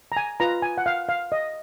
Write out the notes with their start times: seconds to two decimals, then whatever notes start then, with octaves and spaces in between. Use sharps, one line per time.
0.12 A#5
0.17 G#5
0.40 F4 B4 A#5
0.62 G#5
0.78 F#5
0.86 F5
1.09 F5
1.32 D#5